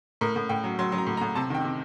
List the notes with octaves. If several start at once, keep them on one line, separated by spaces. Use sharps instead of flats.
A2 A#4
A2
A2 G5
F#3
F#3 C6
F#3 C6
A#5
A2
A#5
A2
C3 A5
D#3 G5
C3